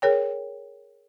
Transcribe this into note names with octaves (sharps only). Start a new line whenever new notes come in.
G#4 A#4 C#5 G5